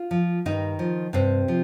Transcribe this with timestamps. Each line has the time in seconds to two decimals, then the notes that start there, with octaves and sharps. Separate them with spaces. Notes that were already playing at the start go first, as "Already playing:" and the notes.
Already playing: F4
0.11 F3
0.45 G2 D#3 D#4
0.79 F3
1.13 G2 C3 C4
1.48 F3